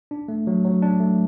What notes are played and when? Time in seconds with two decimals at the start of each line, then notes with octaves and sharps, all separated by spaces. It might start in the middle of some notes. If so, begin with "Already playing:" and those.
0.11 D4
0.28 A3
0.47 F#3
0.65 F#3
0.82 D4
1.00 A3